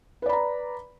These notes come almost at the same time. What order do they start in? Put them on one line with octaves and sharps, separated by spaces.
B4 D5 B5 A#5